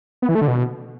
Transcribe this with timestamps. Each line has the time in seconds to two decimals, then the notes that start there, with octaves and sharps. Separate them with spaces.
0.22 B3
0.29 E3
0.35 A3
0.42 D3
0.48 B2